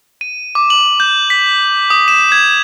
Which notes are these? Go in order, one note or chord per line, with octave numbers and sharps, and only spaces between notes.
D#7
D6
F#7
G6
B6
D#6
E7
G#6